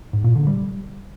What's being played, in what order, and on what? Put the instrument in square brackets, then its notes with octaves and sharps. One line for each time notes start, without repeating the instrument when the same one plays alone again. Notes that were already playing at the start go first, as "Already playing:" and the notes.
[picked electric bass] G#2
A#2
D3
G3